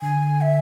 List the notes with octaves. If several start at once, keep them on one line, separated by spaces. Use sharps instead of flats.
D3 G#5
E5